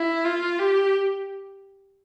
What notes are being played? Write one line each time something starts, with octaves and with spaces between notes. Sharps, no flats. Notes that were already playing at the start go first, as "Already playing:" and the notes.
Already playing: E4
F4
G4